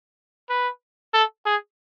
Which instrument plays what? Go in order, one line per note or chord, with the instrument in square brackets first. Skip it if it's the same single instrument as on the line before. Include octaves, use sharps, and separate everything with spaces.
[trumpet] B4
A4
G#4